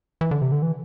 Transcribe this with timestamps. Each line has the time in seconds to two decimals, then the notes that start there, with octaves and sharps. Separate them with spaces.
0.21 E3
0.31 D3
0.42 C3
0.52 D3
0.62 E3